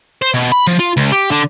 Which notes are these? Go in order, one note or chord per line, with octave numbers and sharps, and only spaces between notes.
C5
B2
B5
F3
F4
C#2
G4
D3